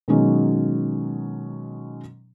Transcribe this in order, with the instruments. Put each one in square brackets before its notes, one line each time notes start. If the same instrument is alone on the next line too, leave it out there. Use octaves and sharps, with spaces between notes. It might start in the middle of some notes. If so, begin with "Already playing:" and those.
[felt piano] B2 D#3 F#3 G#3 C#4 D#4